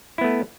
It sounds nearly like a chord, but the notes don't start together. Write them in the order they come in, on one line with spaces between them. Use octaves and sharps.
E4 B3 A3